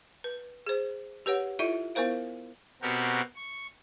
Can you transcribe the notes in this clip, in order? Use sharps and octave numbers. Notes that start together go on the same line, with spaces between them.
B4
G#4 C5
G4 B4 C#5 F#5
E4 F4 A4 D5 E5
B3 E4 A#4 C5 F5
B2 C4 F#4 G4 A#4
C#6